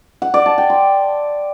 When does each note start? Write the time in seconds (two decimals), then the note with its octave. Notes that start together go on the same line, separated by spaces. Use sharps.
0.22 F#5
0.34 D5
0.46 A5
0.58 G5
0.70 C6